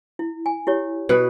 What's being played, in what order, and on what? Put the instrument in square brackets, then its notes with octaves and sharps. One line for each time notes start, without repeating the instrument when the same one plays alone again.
[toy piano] E4
G#5
E4 G4 C#5
[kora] B2 B4